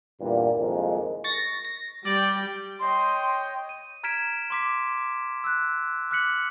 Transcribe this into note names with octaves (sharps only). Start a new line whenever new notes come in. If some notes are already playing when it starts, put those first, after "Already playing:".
E2 G2 A#2
C2 F2 D#3 G#3 A#3
C#6 A6 A#6
A#6
G3 D5 G5
C#5 D#5 G5 C6
D#7
A#5 F6 G#6 B6 D7 E7
C6 D6 B6
E6 F#6
D6 F6 F#6 B6 C#7 F#7